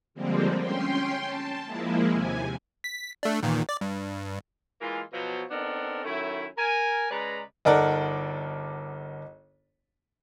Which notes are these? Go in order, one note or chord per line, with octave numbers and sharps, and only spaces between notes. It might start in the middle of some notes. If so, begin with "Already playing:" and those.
D3 F3 G3 G#3 A#3 C4
C#4 G5 C6
A5
F3 G#3 A#3 E4
D#2 C3 G#5
B6
A3 D4
E2 A#2 D#3
D5
G2
E3 G#3 A#3 F4
B2 F3 F#3
B3 C4 D4 D#4 A4 A#4
D#3 F#3 A3 C#4 E4
A#4 G#5
C#3 G#3 B4 D5 A#5
G1 D#4 A4 A#4 D5 F#5